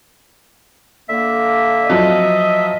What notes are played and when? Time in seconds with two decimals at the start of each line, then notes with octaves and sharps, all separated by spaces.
1.09 D3 A#3 E5
1.90 F3 F#3 D#5